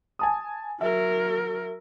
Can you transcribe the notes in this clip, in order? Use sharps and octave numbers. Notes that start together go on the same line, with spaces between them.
G#5 A5 D#6
F#3 A#4 E5